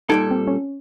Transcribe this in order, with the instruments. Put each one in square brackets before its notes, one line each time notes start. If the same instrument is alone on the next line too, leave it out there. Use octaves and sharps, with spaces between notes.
[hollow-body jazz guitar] A#2 G3 A4 [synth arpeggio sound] D#4 G#6 D7
[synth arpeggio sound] C4
C#4